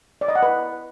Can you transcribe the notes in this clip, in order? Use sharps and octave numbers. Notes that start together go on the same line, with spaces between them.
D5
D#5
F#5
B4